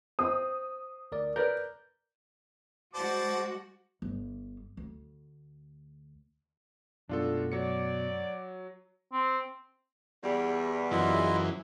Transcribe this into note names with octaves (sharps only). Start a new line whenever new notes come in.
C4 D#6
D2 A#4 D5
A#4 B4 D5 G6
G3 G#3 F#4 C5 D5 A5
G1
D2
F#2 B2 G#3 A3 D4 F4 A4
F#3 D5 C#7
C4
E2 G3
F#2 E3 E4 F4 D#5